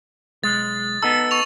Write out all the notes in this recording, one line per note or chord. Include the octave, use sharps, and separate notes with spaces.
B1 G#3 A6
B3 D#4 A4 E6
C#6 F7